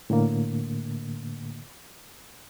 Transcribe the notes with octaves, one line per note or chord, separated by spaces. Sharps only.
A2 D3 A#3